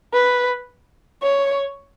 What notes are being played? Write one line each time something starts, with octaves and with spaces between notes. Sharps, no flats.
B4
C#5